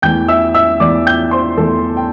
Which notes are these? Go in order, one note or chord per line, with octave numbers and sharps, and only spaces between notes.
E2 E3 A3 G5 G6
E5 E6
E5 E6
E2 E3 A3 D5 D6
G5 G6
C5 C6
E2 E3 A3 A4 A5
G5